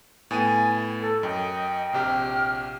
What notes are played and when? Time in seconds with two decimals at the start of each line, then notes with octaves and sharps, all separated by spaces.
0.31 A2 B3 G#5 A6 D#7
1.02 A4
1.23 F#2 D#5 G5
1.93 A#1 C3 G4 F6